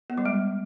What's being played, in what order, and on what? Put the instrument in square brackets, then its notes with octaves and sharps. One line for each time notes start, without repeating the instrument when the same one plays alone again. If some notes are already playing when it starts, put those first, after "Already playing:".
[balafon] B3
G3
G#3